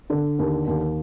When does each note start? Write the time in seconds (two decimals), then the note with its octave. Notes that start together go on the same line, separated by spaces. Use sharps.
0.10 D3
0.39 D#2
0.67 D#2